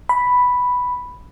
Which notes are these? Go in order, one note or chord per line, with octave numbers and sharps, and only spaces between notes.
B5